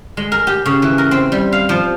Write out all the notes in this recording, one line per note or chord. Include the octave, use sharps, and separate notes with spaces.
G#3
A#4
G4
C#3
E3
A#4
C4
G3
F5
F3